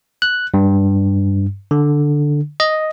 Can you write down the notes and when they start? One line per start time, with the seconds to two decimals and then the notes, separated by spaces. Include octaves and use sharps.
0.22 F#6
0.54 G2
1.71 D3
2.60 D#5